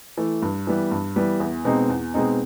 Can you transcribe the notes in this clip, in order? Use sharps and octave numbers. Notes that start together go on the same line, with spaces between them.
E3 A3
G2
E3 G3 B3
G2
E3 G3 B3
E2
B2 G#3 C4 D#4
E2
B2 G#3 C4 D#4